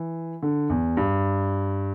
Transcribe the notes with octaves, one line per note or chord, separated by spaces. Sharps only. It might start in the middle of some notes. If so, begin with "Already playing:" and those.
Already playing: E3
D3
E2
G2